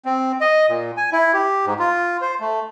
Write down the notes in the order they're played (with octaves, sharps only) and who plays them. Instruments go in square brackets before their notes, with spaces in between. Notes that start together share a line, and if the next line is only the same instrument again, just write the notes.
[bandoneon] C4
D#5
A#2
G#5
E4
G4
G#2
F4
C5
A3